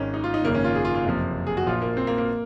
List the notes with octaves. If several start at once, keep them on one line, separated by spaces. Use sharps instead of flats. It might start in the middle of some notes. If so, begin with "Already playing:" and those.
Already playing: G#1 G#2 D#3 C#4
D#4
F4
D#4
G#1 F#2 C#3 A#3
C#4
F4
G#4
F4
F4
F#1 F2 C3 F3
G#4
F#4
A#1 A#2 F3 F4
A#3
C4
A#3
A#3